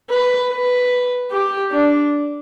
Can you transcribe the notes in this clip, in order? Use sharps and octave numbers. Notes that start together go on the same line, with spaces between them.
B4
B4
G4
D4